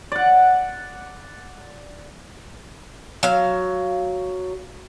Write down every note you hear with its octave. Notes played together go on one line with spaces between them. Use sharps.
D5 F#5
F#3 F5